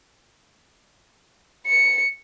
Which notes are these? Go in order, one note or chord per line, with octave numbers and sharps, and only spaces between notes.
C#7